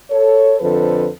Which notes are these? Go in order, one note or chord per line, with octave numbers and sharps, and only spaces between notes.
A4 C#5
F2 D3 F3 A4 B4 C5